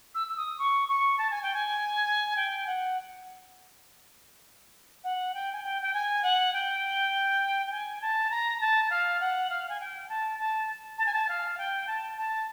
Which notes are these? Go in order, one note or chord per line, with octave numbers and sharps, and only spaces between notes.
E6
E6
D#6
C#6
C#6
A5
G#5
G5
G#5
G5
F#5
F#5
G5
G#5
G5
G5
G#5
F#5
G5
G5
G#5
A5
A#5
A5
F5
F#5
F5
G#5
G5
A5
A5
A5
G#5
A5
F5
G5
A5
A5